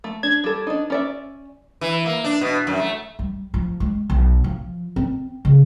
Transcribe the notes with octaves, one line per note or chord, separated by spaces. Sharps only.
A3
D4 G#6
G3 A4
D4 D#4
C#4 D5 E5
E3
A#3
D4
B2
F#2
A3
G3
F3
G#3
B1
F3
C4
C#3